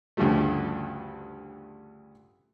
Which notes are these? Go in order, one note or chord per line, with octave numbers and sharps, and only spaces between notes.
D2 G2 C#3 F3 G3 A3